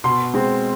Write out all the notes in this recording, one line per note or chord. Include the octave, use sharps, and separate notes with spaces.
B2 C6
G#3 C4